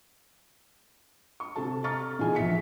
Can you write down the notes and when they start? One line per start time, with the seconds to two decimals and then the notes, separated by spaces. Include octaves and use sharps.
1.40 C#6
1.56 C3 A4 A5
1.84 A#5 C#6 F6 A6
2.19 A#2 E3 D#4 E4 G#4 G#5
2.35 A#1 B2 E5 B6 C#7